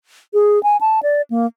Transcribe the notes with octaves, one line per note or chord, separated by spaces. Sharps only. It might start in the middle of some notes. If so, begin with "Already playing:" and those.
G#4
G#5
A5
D5
A#3